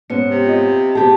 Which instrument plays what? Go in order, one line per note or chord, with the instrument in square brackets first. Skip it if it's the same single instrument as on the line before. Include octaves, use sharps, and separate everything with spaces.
[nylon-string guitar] G#2 B3 C#4 [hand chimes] C#7
[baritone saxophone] C3
[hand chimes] F4 D#5
[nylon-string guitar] B3 G4 G#4 [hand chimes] A5